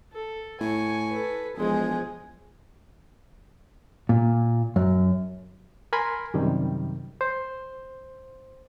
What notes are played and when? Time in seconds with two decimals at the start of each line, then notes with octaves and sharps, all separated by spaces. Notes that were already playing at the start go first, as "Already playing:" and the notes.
0.13 A4
0.60 A2 G#5 C#6
1.09 A4 B4
1.57 E1 F3 G#3 G#4
4.09 A#2
4.76 F#2
5.93 A#4 G#5 B5 C6
6.34 F#2 C3 D#3 G3
7.21 C5